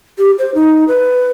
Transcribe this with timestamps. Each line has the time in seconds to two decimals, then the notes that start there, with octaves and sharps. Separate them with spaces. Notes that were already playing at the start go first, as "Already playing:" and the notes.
0.19 G4
0.39 C5
0.55 D#4
0.88 B4